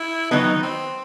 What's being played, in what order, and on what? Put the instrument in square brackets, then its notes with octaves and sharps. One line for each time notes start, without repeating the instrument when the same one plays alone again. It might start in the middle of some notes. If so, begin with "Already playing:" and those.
Already playing: [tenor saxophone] E4
[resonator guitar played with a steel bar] D#3 F#3 B3 F#4 [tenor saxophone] D#4
[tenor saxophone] C4